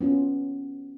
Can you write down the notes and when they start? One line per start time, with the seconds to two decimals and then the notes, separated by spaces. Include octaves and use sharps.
0.01 B3 C#4 F4